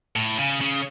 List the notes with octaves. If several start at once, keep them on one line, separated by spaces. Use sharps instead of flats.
A2
C#3
C#3